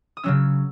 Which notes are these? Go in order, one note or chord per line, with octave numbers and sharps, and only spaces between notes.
D#6
C#3 F#3 C#4 E6